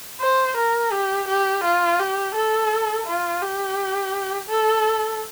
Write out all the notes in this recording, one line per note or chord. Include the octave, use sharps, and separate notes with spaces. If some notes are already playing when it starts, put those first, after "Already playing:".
C5
A#4
G4
G4
F4
G4
A4
F4
G4
A4